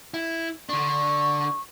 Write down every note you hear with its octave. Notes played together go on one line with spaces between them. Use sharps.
E4
D3 D4 C#6